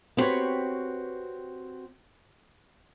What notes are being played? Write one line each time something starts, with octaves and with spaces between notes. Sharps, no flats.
B3 C4 F#4 G4 B4 C#5